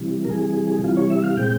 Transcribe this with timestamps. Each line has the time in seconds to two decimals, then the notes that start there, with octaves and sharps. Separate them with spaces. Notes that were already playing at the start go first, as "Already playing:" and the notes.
Already playing: C3 E3 G3
0.25 A#4
0.30 C3 E3 G3 G#4
0.83 C3 E3 G3 F4
0.97 C#5
1.10 E5
1.24 F5
1.37 A#2 G#3 C4 G5